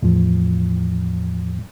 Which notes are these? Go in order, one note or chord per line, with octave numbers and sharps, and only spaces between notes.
E2 A2 F3